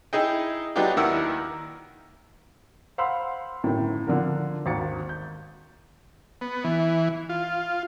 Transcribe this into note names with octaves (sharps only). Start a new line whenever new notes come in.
D#4 E4 G#4 D#5 G5
F#3 B3 D4 D#4 F4 G4
D#2 D#3 E4 A#4 F#5 E6
C5 F5 F#5 B5 C6 E6
G1 F#2 A2 D#3 G5
D3 F3 D4 F#4 A#4
G#1 D#2 A6 C#7
G6
B3
E3
F4